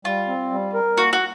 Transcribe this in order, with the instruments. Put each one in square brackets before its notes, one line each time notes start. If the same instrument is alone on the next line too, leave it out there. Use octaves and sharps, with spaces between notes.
[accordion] G3 [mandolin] F4
[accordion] C4
G3
A#4
[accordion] A#3 [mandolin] F#4
[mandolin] F#4